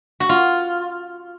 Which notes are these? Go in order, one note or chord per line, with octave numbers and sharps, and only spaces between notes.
F#4
F4